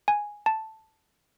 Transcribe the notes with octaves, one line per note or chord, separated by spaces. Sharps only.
G#5
A5